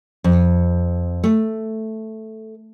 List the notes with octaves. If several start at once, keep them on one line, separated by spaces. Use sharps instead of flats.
F2
A3